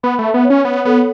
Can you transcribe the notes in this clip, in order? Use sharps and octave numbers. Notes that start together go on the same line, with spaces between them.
B3 B5
A3
E5
B3
C#5
C#4
B3 C#5
B3 A4